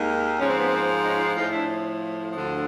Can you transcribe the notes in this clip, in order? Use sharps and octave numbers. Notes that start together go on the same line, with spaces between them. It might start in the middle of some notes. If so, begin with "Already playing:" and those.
Already playing: D#2 D#3 G#3 A#3
G#2 F3 C#4
C4
B3
A#3 C4
C#4 D#4
D#4 F4
A2 F3 D#4 F4
D4 E4
D2 D3 F3